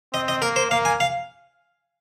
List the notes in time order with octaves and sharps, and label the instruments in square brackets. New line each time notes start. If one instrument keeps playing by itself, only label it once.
[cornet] C4 [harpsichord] D#5
[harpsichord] D#5
[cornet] A#3 [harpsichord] A#4
[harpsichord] C5
[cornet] A#3 [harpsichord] F5
[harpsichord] G#5
F5